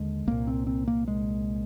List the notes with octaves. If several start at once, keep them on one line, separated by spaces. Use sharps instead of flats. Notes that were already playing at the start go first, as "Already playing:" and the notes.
Already playing: D#2 D3 G#3
C2 A#2 A#3
C4
C4
A#3
G#3